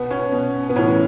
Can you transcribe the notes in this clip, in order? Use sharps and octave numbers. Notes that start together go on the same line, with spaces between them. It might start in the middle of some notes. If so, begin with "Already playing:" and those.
Already playing: B2 B3
C#4
B2
B3
A2 E3 C#4